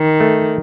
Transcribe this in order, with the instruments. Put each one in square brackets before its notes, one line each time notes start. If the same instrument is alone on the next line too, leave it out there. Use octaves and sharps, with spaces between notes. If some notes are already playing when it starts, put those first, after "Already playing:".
Already playing: [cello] D#3
[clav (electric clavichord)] A3